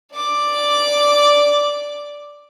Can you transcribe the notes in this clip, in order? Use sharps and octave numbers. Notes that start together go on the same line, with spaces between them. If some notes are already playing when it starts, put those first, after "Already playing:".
D5 D6